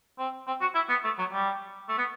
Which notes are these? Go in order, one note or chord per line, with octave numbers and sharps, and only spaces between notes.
C4
C4
F#4
E4
B3
A3
F#3
G3
A3
B3